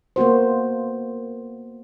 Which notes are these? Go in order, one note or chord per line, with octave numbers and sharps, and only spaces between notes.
A#3 B3 F#4 C5